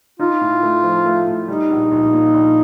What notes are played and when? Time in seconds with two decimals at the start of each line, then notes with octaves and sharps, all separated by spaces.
0.19 D#4 F4
0.41 A2
0.63 A3
0.83 F3
1.05 A3
1.27 A2
1.48 G3 D#4
1.70 A#1
1.92 A#1
2.13 A#2
2.34 A#1